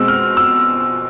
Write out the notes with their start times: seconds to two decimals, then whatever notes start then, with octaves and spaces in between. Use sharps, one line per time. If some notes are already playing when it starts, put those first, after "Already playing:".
Already playing: B2 G#3 C4 E6
0.08 F6
0.37 E6